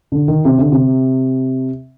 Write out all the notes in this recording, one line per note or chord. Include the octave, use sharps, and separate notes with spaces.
D3
D#3
C3
D3
C3